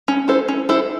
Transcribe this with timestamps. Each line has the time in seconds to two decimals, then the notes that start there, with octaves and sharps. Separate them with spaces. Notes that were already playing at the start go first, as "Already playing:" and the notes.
0.08 C#4
0.28 E4 A4 C5
0.48 C#4
0.69 E4 A4 C5